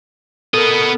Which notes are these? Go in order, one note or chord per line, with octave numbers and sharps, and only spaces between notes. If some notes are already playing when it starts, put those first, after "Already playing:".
B3 A4 A#4 D#5